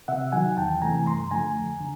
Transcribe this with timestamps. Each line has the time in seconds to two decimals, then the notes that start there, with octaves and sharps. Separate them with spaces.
0.08 C3 E5 F#5
0.32 D#3 F#3 F#5 G#5
0.57 E2 G5 A5
0.82 C3 E3 A3 G#5 A#5
1.06 G2 A#5 C6
1.31 D3 F3 A3 G#5 A#5
1.56 F2
1.81 D3